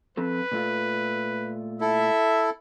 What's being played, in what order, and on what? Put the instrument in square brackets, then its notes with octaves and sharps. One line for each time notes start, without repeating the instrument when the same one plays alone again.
[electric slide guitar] F3 C4 A4 [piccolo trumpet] B4
[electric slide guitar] A#2 A3 F4
[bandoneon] E4 A4 [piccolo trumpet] E5